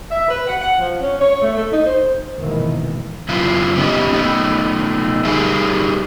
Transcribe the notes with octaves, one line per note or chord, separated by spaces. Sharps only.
E5
B4
F#5
F#5
F3
C#4
C#5
A3
A3
D#4
C5
F1 G#2 B2 D#3 E3 A#3
F#2 C#3 B3 E4 F4
A3 B3 C#4 D#4 G4
A3 B3 D#4
G3 D#4 G4 G#4 A#4 E5